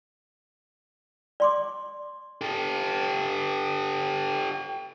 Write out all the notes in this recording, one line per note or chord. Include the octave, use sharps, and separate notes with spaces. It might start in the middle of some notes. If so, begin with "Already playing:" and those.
D5 C6 D6
G4 A4